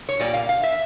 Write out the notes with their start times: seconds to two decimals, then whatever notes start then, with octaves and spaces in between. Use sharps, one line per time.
0.09 C#5
0.20 A#2 G3 A#3 D5
0.34 F5
0.49 F5
0.63 E5